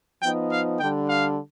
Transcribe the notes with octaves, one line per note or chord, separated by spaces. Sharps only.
F3 B3 D#4 G5
F5
D3 G3 D4 G5
F5